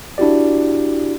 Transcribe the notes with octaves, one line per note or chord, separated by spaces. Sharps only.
D4 E4 F#4 G4 D5